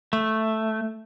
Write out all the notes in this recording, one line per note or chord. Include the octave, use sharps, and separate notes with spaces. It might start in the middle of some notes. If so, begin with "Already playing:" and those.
A3